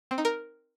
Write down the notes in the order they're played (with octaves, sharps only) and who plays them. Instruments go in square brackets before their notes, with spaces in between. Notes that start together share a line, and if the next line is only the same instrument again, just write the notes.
[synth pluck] C4
D#4
A#4